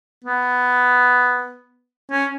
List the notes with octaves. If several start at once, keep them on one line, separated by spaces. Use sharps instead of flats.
B3
C#4